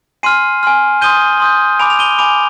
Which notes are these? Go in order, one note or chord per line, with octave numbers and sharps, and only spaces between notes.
G#5 C6 F6 C7 D#7
G#5 C6 F6
C6 D#6 G6 D#7 G7
C6 D#6 G6
G#5 B5 D6 D7 F7
F7
D#7 G7
G#5 B5 D6 D7 F7